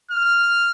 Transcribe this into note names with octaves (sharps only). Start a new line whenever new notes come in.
F6